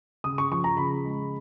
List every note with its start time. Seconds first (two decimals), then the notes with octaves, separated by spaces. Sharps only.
0.24 C#3 D#6
0.38 C#6
0.51 F3 C#6
0.64 A#5
0.77 C#3 B5
1.04 G#3